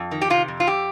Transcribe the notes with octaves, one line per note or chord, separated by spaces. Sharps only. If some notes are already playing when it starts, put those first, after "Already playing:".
Already playing: F2
D#3
G4
C3 F4
F2
F4
F2 G4